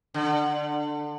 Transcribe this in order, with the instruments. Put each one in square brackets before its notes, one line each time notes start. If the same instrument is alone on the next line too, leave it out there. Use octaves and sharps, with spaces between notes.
[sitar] D3